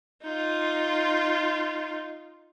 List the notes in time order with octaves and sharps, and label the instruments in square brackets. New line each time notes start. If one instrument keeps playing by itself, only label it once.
[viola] D#4 F4